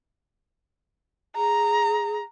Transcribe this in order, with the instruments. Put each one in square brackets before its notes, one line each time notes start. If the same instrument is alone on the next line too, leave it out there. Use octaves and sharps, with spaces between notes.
[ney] G#4 [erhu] A#5